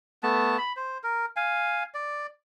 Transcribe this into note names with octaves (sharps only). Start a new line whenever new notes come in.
A3 B3 A5
B5
C5
A#4
F5 G#5
D5